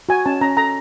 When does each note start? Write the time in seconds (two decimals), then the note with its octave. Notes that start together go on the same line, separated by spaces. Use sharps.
0.09 F#4 G#5
0.26 C#4 A5
0.41 C#4 A#5
0.57 A4 A#5